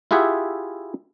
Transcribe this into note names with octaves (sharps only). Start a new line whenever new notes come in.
E4 F4 G4 G#4 E5 F#5